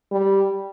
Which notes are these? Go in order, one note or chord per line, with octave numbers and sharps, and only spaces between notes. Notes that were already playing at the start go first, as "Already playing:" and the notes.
G3